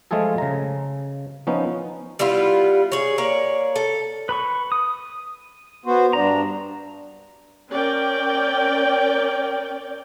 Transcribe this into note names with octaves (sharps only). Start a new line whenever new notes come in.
F3 G#3 A3 F4 G#4 A4
C#3 A#5
F3 B3 C#4 D#4
G3 B3 E4 F4
G#4 C#5
A#3 C#5 D5
A4
B4 B5 C#6
D#6
B3 F#4 C5
G2 D4 A#5
C#4 A#4 D5 G5